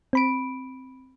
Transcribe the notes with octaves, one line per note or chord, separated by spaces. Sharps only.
C4 B5 D7